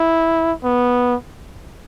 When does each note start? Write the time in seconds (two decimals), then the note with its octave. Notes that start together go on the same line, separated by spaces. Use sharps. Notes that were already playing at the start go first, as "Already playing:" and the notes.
Already playing: E4
0.64 B3